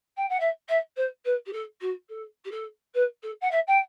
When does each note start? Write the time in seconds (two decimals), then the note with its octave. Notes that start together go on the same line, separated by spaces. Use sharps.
0.17 G5
0.29 F#5
0.39 E5
0.68 E5
0.96 C5
1.25 B4
1.46 G4
1.53 A4
1.81 F#4
2.09 A4
2.44 G4
2.51 A4
2.94 B4
3.22 A4
3.41 F#5
3.51 E5
3.67 G5